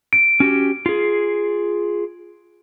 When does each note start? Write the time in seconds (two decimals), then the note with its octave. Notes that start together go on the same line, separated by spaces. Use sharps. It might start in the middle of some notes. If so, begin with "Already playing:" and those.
0.13 D7
0.40 C#4 F#4 G4
0.86 F4 G#4